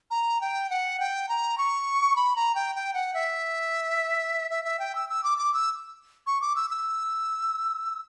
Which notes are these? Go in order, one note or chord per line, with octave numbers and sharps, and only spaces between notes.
A#5
G5
F#5
G5
A#5
C#6
B5
A#5
G5
G5
F#5
E5
E5
E5
G5
E6
E6
D6
D6
E6
C#6
D6
E6
E6